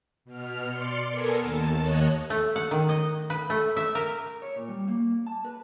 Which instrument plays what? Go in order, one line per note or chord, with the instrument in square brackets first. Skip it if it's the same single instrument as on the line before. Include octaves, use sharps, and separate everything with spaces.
[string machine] B2 F6
D5 C6 C#7
B3 A4 A#4 G#5
D#2 A5
D#2 C#5 D#5 F#6
[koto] A3
F#5
D#3
D#5
B4
A3
E5
A#4
[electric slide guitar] C#5
A#2
G3
A#3
A5
B4